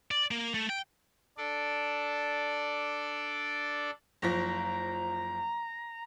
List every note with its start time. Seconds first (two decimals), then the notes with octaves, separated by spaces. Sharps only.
0.11 D5
0.31 A#3
0.54 A3
0.70 G5
1.37 D4 A4 D5
4.22 F#1 F3 A#5 A#6